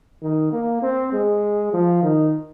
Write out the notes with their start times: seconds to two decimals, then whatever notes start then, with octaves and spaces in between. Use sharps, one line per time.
0.22 D#3
0.52 A#3
0.82 C4
1.13 G#3
1.73 F3
2.02 D#3